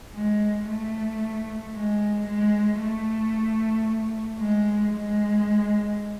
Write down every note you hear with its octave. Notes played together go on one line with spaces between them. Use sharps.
G#3
A3
G#3
G#3
A3
G#3
G#3